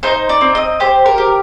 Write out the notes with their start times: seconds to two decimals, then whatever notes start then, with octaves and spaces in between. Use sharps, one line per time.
0.03 D#4 C5
0.29 D5
0.41 C4
0.55 D#5
0.80 G4 C5
1.06 A#4
1.18 G4